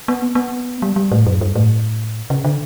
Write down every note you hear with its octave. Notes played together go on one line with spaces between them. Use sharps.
B3
B3
G3
G3
A2
F#2
G2
A2
C#3
D3